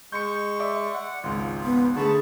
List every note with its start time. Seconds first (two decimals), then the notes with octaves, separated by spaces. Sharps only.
0.12 G#3 C#6 G6 C#7
0.60 D5 E5 D6
0.94 F#5
1.24 G#1 C#2 F4
1.64 B3
1.96 D3 A3 G#4 A5 B5 C#6